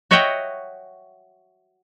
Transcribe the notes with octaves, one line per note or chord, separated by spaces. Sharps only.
F#4 C#5 D#5 E5 F#5 G5